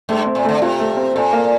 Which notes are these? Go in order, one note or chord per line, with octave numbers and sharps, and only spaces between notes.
G2 A3
C4
A#2
D3 A3
C3 F4
A3
C4
A#2 A4
A#3